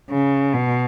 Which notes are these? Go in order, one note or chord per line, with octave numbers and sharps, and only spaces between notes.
C#3
B2